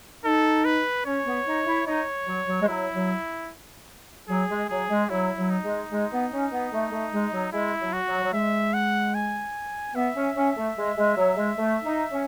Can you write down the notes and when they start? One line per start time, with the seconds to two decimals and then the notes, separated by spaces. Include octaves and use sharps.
0.25 D#4 A4
0.65 B4
1.05 C#4 C#5
1.26 B3
1.46 D#4
1.66 E4
1.86 D#4 C#5
2.26 F#3
2.47 F#3
2.61 G#3
2.67 F#3 E4
2.94 F#3
4.29 F#3 G#4
4.49 G#3
4.69 F#3 G#4
4.89 G#3
5.09 F#3 E4
5.37 F#3
5.50 D#4
5.63 G#3
5.90 G#3
6.11 B3
6.31 C#4
6.52 B3
6.72 A3
6.92 A3
7.12 G#3
7.32 F#3
7.52 G#3 E4
7.79 F#3
7.93 F#4
8.07 F#3
8.23 F#3
8.33 G#3 E5
8.74 F#5
9.14 G#5
9.95 B3 E5
10.15 C#4
10.35 C#4
10.56 A3
10.76 G#3
10.97 G#3
11.16 F#3
11.36 G#3
11.57 A3
11.84 D#4
12.10 C#4